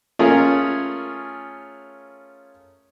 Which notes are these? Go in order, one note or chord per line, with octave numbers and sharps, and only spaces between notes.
A3 C#4 F4 G#4 A#4 C#5